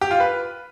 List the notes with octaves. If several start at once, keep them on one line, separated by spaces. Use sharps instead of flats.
G4
F4
B4